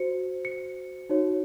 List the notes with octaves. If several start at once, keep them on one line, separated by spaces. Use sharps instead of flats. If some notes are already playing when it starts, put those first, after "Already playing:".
Already playing: F#4 C5 C#7
C#7
D#4 F#4 C#5